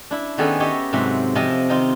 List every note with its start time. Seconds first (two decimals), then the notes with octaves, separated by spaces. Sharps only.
0.11 D4 E4
0.38 D#3 B3 C#4 D4 G#4 A4
0.60 G4 C#5 D#5 E5
0.93 G#2 C3 F#3 E5 F#5
1.35 C3 F3 D#5 A5
1.69 D#3 D#4 F4